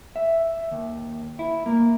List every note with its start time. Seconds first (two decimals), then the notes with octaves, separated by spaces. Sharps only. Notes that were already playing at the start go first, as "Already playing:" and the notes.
0.16 E5
0.71 D#2
1.39 E4
1.66 A#3